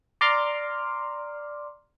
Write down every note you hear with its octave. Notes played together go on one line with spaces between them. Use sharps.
D5 A#5 C6 D6 F6